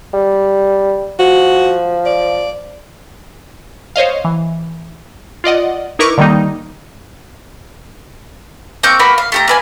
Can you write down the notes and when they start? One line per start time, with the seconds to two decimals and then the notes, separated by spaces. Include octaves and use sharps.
0.13 G3
1.19 F3 F#4
2.06 D5
3.96 C5 C#5 D#5 F5
4.25 E3
5.44 F4 D5 D#5 F#5
5.99 D#4 E4 A#4 B4 C#6 D6
6.18 D3 D#3 G3 A#3 D#4
8.83 A#3 C4 C#6 G6
8.99 A#3 F#4 B4
9.18 F5
9.32 A3 G4 A#5
9.48 A#3 B4 G#5